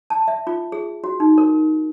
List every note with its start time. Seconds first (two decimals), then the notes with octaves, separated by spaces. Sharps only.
0.10 A5
0.28 E5
0.47 F4
0.72 G#4
1.04 F#4
1.20 D#4
1.38 A#4